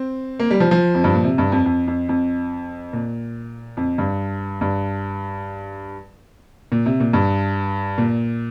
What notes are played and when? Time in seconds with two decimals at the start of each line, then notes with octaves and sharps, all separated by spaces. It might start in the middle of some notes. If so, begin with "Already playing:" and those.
Already playing: C4
0.39 A#3
0.51 G3
0.60 F3
0.71 F3
0.95 F2
1.04 G2
1.14 A#2
1.24 C3
1.38 G2
1.52 F2
1.66 F2
1.87 F2
2.09 F2
2.93 A#2
3.77 F2
3.98 G2
4.61 G2
6.72 A#2
6.86 C3
7.00 A#2
7.13 G2
7.98 A#2